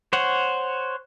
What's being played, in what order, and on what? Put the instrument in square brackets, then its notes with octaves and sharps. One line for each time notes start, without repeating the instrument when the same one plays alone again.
[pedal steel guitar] C5 C#5 F#5